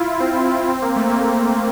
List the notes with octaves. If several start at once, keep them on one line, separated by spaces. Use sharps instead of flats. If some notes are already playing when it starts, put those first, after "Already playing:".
Already playing: E4 F4
C4
C4
A#3
A3
A#3